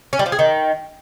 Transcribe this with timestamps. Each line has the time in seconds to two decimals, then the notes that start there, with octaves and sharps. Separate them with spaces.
0.13 C#4
0.19 G3
0.26 F3
0.32 G#4
0.39 D#3